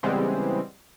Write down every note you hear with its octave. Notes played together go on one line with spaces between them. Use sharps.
C#3 E3 G3 G#3 B3 C4